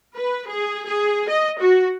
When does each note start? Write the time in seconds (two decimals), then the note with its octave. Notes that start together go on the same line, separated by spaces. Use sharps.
0.16 B4
0.48 G#4
0.85 G#4
1.29 D#5
1.60 F#4